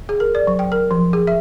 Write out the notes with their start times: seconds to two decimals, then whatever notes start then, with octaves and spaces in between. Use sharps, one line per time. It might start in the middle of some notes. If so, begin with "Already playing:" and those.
0.09 G#4
0.20 A#4
0.35 D5
0.47 F#3
0.59 G5
0.72 A#4
0.91 F3
1.13 G#4
1.27 E5